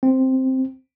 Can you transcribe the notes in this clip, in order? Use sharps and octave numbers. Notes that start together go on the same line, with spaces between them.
C4